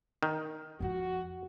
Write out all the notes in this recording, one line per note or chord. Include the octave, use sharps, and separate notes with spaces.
D#3
F2 F3 F#4